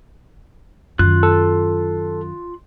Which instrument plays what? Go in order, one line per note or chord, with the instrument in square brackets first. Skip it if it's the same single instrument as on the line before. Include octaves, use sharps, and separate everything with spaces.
[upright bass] F#2 D#3 [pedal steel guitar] F4 F#6
[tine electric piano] A4